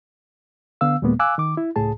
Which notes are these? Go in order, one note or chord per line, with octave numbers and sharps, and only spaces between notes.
D3 B3 F5 E6
D#2 A#2 G#3 A#3 B3
F5 G#5 D6 E6 F#6
D#3 D6
E4
C#2 A2 G#4 A5